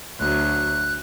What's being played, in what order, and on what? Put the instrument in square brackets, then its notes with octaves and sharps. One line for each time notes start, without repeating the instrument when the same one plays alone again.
[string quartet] D2 F#3 [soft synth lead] F#6